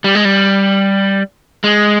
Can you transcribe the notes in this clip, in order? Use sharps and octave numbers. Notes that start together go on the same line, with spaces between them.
G3
G#3
G3
G#3